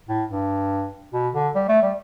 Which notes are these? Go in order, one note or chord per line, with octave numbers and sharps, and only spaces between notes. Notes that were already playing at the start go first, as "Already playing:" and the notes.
A2
G2
B2
D3
G3
A3
G3